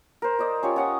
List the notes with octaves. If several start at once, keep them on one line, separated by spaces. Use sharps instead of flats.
A#4 C5
C5 D5 D#5
C#4 F4 G4 C#5
C#4 F#5 D#6